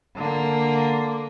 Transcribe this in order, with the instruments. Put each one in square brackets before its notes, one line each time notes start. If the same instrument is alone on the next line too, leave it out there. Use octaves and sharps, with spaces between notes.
[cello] D3 A#3